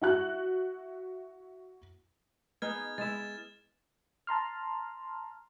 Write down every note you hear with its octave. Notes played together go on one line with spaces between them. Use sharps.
E4 F#4 F#6
B3 D#4 G#4 F6 G#6
G#3 E4 A6 E7
A5 A#5 C6 F6